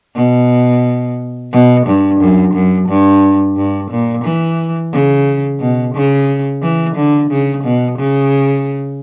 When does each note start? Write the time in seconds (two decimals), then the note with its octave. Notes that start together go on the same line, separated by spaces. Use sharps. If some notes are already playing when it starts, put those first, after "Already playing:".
0.16 B2
1.53 B2
1.87 G2
2.21 F#2
2.54 F#2
2.89 G2
3.57 G2
3.91 A#2
4.24 E3
4.93 C#3
5.60 B2
5.95 C#3
6.63 E3
6.96 D3
7.31 C#3
7.64 B2
7.99 C#3